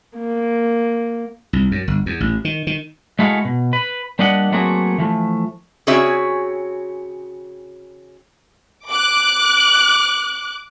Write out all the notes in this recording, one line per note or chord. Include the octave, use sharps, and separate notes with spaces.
A#3
C2
F#2
G1
E2
A1
D#3
D#3
G#3 A3 E4 F#4 G#4 F5
B2
B4
G3 A#3 D4 G4 D#5 F#5
F#3 A3 A#3 C4 F#4 G#4
E3 F3 A3
C#3 C4 F#4 G#4 C#5 E5
D6 F#6